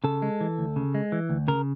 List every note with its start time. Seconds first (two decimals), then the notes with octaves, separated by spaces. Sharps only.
0.04 C#3 A4
0.22 G#3
0.41 E3
0.58 D2
0.76 C#3
0.95 G#3
1.12 E3
1.29 D2
1.48 C#3 A#4